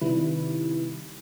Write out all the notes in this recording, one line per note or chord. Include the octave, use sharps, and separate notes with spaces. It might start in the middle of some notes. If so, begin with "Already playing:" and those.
C3 D#3 G3 E4 B4